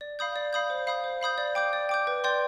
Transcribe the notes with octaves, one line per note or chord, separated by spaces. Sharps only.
D5
F5 B5 D#6 G6
D5
F5 B5 D#6 G6
C5
F5 B5 D#6 G6
C5
F5 B5 D#6 G6
D5
G5 D6 G6
D5
G5 D6 G6
B4
D5 G5 C6 G6